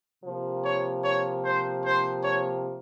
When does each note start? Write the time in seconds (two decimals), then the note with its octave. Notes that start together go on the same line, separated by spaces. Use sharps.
0.24 C3 F3 A#3
0.63 C#5
1.03 C#5
1.43 C5
1.83 C5
2.22 C#5